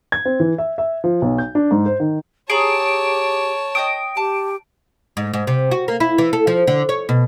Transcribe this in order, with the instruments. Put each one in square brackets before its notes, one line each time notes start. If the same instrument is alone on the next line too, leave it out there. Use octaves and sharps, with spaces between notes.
[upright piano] G#6
C4
E3
E5
E5
F3
B1
G6
D4
G#2
C5
D#3
[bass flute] G4 [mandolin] G#4 A#5 [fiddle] C#5 A5 [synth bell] D7
[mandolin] D#5 G5 D#6 [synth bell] D7
[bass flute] G4 [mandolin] A5
[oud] G#2
G#2
C3
F#4
A#3
E4
E3
A4
F3
D3
C#5
B2